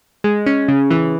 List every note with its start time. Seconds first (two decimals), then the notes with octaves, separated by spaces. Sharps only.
0.24 G#3
0.46 C#4
0.68 C#3
0.91 E3